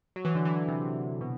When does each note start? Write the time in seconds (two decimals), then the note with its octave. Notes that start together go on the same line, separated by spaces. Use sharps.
0.16 F#3
0.25 E3
0.35 D3
0.45 E3
0.68 C3
1.21 B2